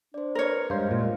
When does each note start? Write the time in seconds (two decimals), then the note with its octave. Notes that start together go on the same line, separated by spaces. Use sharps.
0.14 D4 C5 D5
0.35 A#4 B4 C#5
0.70 G2 G#3 C5 F5
0.91 A#2